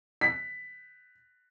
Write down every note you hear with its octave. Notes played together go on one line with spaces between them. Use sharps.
B6